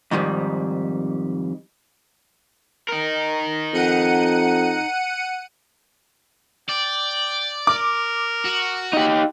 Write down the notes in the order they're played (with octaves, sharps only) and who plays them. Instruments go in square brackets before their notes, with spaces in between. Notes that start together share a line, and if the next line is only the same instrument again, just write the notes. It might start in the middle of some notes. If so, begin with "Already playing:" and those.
[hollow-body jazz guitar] F2 G#2 D#3 G3
[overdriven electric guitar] D#4 A#4
[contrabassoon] F2 [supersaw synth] F#5 C#7 D#7
[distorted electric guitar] D5 [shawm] G5
[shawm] A#4 [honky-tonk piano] D6
[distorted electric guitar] F#4
[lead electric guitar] D#4 G4